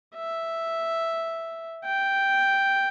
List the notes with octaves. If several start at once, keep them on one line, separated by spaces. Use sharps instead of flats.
E5
G5